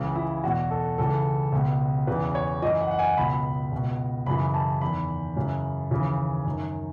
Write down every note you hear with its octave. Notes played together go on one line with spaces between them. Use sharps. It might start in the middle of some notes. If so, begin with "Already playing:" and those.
Already playing: C#2 C#3 E3
E4
E2 B2 F#4
A4
C#2 C#3 E3 A4
C#2 B2
E2 C#3 E3 B4
C#5
F#2 E3 D#5
F#5
F#5
G#5
C#2 B2 B5
C#2 B2
F#2 C#3 E3 B5
A5
E2 D#3 B5
F#2 C#3 E3
D#2 C#3 E3
F#2 D#3